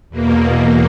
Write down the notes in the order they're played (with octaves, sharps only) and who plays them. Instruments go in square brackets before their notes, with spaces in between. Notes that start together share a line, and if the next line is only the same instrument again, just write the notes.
[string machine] E2 B2 A#3